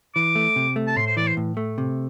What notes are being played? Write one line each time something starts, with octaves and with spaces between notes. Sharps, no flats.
E3 D6
A3
C3
A3
A5
A2 C6
C5
E3 D5
C5
A2
A3
C3